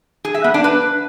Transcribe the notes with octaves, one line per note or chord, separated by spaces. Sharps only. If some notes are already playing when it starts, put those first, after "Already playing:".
G#4
E5
B3
D4
B4